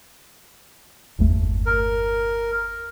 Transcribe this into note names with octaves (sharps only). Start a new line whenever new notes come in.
G1 E2 A3
A#4